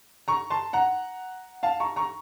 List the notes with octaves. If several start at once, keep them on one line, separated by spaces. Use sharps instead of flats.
A#5 C#6
A5 C6
F#5 A#5
F5 A5
A#5 C#6
A#5 C#6